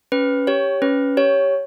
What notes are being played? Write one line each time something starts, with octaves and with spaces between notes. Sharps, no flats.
C#4 B4
G4 C#5
C#4 B4
G4 C#5